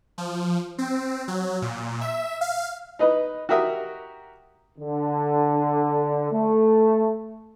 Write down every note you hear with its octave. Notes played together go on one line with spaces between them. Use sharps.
F3
C4
F#3
A#2
E5
F5
D#4 B4 D#5
F#4 G4 A#4 E5 D#6
D3
A3